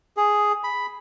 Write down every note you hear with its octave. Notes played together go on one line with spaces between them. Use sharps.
G#4
B5